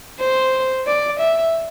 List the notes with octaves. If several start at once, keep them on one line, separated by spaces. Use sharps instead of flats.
C5
D5
E5